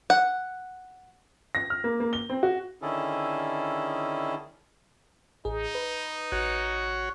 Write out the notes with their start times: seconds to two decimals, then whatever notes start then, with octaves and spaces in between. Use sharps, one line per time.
0.10 F#5
1.55 A#6
1.70 F6
1.84 A#3
2.00 A#3
2.13 G7
2.29 C4
2.43 F#4
2.82 D3 D#3 C#4 E4 G#4 A4
5.45 A1 D#4 G#4
5.75 B4
6.32 A1 F#4 C#5